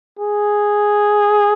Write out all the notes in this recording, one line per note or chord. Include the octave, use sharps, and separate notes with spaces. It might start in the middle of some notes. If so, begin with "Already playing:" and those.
G#4